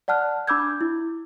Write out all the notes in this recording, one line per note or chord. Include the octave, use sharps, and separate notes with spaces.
D5 F#5 A5 F6 F#6
D4 B5 D6 E6 G6 G#6
E4